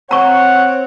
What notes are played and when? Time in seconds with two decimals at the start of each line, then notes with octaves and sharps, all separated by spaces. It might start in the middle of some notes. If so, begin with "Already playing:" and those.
0.11 C4 C#5 F#5 A#5 C#6